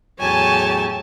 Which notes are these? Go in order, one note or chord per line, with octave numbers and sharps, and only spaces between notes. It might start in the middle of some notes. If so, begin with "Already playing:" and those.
E2 A2 F#3 G4 C#5 G#5 A5